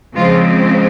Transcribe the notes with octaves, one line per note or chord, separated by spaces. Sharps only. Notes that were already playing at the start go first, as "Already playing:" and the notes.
C#3 F3 G#3 C4 F4